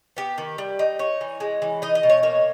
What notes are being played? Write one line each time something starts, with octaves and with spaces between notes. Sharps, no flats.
B3 G4
D#3
G3
D#4
D#4 C#5
E3
G#3
E3
D#4 D#5
D#5
B2
C#5
A#3 C#5